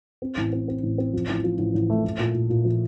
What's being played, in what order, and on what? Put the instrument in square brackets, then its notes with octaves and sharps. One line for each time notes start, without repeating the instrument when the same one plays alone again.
[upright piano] C4
A1
C4
C4
A1
C4
F3
A1
F3
A1
A1
A3
A3
A#2
A#2
A#2
F3